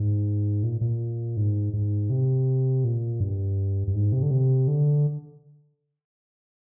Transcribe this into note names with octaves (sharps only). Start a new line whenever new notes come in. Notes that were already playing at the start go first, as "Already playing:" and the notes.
Already playing: G#2
A#2
A#2
G#2
G#2
C3
A#2
G2
G2
G#2
C3
D3
C3
D3